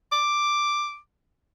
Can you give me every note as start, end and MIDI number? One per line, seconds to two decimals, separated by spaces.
0.12 0.98 86